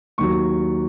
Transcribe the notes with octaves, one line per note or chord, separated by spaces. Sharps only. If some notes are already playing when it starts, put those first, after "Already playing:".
D#2 D#3 F#3 C#6